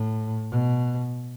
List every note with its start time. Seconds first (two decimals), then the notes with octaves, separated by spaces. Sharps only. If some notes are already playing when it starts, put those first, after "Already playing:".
Already playing: A2
0.51 B2